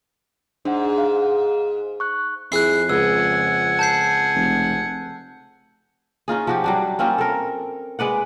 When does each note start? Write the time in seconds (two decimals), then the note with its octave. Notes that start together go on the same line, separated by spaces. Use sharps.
0.65 G#2 D4 F#5
0.98 F5
2.00 C#6 F#6
2.52 F2 E4 G#4 F#6 C7
2.90 C#2 F#5 G#5 E6
3.79 A5 G6 C7
4.35 F1
6.28 C#4 D#4 F4 G#4
6.47 F3 F#4 G4
6.64 F#3 G3 D4
6.99 A#3 C4 C#4 F4
7.18 A4 A#4
7.99 G#3 B4 D5 F#5